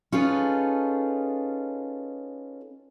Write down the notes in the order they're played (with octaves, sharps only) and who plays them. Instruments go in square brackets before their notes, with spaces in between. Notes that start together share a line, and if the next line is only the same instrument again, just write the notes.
[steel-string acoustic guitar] C#4 D#4 F4 G#4 A4 B4